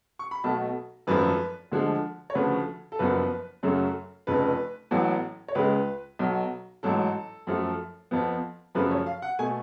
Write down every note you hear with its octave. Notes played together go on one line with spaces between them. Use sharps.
C#6
B5
B1 B2 A3 A5
G#1 F#2 F3 A3 B4
D2 D3 F3 G#3
C#5
D2 C#3 F3 A3 B4
A4
F#1 F#2 F3 B3 B4
F#2 C#3 F#3 A3
F1 F2 C#3 B4
A1 A2 F#3 B3
C#5
C#2 C#3 G#3 B4
B1 B2 F#3
A1 G#2 F#3 A4
F#2 F3 A3
F2 F3 B3
F#2 C#3 F3 A3 B4
C#5
F5
F#5
B2 A3 G#5